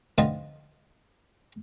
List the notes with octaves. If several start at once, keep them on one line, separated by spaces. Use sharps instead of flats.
D3 F3 B3 C4 D#4 F4